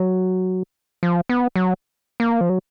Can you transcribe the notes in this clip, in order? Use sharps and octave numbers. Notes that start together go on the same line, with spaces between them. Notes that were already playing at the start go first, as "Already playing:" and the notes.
Already playing: F#3
F3
B3
F#3
A#3
F3
F#3